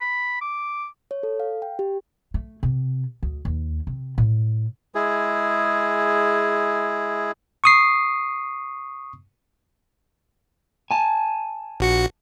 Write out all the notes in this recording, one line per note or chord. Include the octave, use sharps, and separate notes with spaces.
B5
D6
C#5
A4
F5
G5
G4
A3
C3
D2
D#2
C3
A2
G#3 E4 G#4
C#6 D#6 C7
G#5 A5
A#1 F#4 C#7